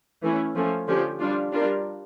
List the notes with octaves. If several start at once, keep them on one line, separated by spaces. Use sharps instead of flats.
E3 A3 C#4 E4
F3 A3 C#4
D3 F3 C#4 G4
G3 D4 F4
G3 D4 F4 A#4